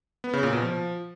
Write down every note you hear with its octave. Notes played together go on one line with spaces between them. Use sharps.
B3
C#3
A#2
B2
F3